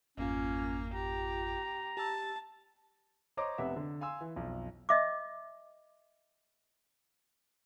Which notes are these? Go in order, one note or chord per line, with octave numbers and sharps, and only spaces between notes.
G#1 F2 A#3 C#4 F4
G4 A#5
G4 A5 E6
C5 C#5 D#5 A#5 C6 D6
F1 C3 B3 B4 E5 F#5
D3
F5 G#5 C6 E6
E3
B1 F2
D#5 E5 D6